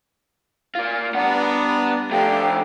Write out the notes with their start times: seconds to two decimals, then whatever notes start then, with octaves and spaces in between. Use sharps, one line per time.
0.75 A#3 F4
1.14 G3 B3 D4 F#5 A#5
2.11 F2 A3 D4 G4 F5 G5 A#5